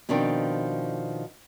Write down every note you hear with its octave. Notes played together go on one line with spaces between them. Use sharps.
B2 D#3 F3 C4 D4